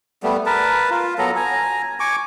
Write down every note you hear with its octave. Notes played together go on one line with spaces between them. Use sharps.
G3 A3 B3
A#4 B4 A5
F4
F#3 B3 A4 A#5
G#5 A#5
G#5 C#6 D6